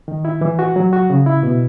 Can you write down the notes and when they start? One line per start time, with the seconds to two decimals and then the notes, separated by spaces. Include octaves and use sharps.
0.08 D#3
0.25 E4
0.41 E3
0.59 F#4
0.76 F#3
0.93 F#4
1.10 C#3
1.26 E4
1.43 B2